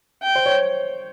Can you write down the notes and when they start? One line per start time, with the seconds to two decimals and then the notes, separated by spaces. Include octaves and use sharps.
0.23 G5
0.35 C5
0.46 C#5